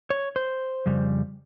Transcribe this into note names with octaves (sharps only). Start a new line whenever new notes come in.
C#5
C5
F2 C#3 G3